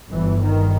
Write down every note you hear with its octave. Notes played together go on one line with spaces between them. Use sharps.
G1 G2 E3
D#3